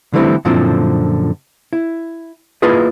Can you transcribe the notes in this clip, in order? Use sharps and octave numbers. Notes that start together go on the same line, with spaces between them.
D3 E3 G3 A3 C4 E4
F#2 A#2 D3 F3 C4 E4
E4
A#3 E4 F4 G#4 B4 D#5